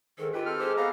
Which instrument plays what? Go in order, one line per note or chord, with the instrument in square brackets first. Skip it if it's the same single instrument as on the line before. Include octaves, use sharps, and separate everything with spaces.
[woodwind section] G#2 D#3 [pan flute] A4
[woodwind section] D#4 G4 B4 [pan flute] F4
[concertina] C4 A4 F6
[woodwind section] G#3 G4 [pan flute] C5
[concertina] B3 A4 A#5 [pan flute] F5